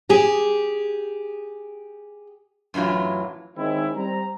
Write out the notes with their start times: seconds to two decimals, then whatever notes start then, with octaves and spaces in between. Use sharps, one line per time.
0.09 G4 G#4
2.74 F#2 A2 E3 F#3 F4
3.56 D#3 G#3 C4 C#4 D#4 E4
3.95 G3 C4 A#5